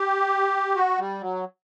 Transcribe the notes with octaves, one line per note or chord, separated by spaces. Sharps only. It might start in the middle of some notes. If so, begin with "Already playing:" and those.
Already playing: G4
F#4
G3
F#3